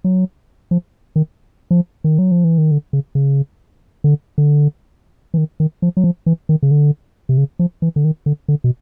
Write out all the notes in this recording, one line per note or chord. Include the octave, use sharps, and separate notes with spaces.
F#3
F3
D#3
F3
D#3
F#3
F3
E3
D#3
D3
C#3
C#3
D3
D3
E3
D#3
D#3
F3
F#3
F3
E3
D#3
C#3
D3
C3
C#3
F3
E3
D3
D#3
D3
D3
B2